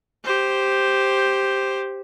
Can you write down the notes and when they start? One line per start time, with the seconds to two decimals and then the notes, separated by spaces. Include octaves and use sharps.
0.25 G4 C5